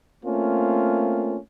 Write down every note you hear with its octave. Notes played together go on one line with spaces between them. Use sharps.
A3 A#3 C4 C#4 F4